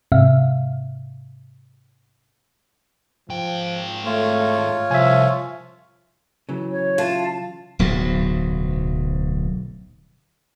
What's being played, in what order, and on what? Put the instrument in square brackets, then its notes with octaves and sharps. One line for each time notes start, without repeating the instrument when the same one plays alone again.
[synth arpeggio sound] G#2 C3 E5 F5
[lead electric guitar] G#2 G5 [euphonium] F3
[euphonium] A3 [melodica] F4 C#5
[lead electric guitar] C2 [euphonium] F3 [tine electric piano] E5 G#5
[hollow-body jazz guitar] C#3 E3 F#3
[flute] C#5
[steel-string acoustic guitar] F4 [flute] A5
[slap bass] D1 B1 G#2 F#3